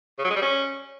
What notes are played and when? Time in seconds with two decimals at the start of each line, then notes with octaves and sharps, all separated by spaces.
0.19 C#3
0.24 F#3
0.30 G#3
0.36 G3
0.42 C#4